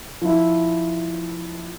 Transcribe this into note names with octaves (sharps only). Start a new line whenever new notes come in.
F3 E4